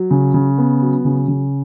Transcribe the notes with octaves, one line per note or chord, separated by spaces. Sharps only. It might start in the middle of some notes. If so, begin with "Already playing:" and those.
Already playing: F#3
C#3
C#3
B3
F#3
C#3
C#3